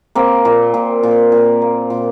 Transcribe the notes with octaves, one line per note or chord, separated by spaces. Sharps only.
A#3 C4
A#2
A#2
A#2
A#2
A#3
A#2